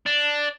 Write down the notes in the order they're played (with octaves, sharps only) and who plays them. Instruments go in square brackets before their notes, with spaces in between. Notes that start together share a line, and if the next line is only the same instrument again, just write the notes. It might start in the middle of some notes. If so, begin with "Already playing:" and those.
[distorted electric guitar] D4